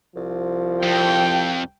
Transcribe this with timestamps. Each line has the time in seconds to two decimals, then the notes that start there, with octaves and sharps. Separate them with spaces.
0.16 C2 F3
0.83 F2 G5